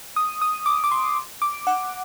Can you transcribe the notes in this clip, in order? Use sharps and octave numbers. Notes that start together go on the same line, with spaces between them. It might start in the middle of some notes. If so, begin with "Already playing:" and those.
D#6
D#6
D6
D6
C6
D6
F#5